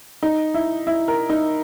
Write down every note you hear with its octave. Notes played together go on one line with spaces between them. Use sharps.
D#4
E4
E4
A#4
D#4